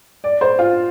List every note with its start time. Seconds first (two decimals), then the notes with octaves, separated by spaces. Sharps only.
0.24 D5
0.41 C5
0.59 F4